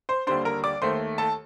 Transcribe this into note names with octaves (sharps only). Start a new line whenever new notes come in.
C5 C6
D#2 D3 G3 D4 C5 C6
A#4 A#5
D5 D6
D#2 D#3 A3 C5 C6
A4 A5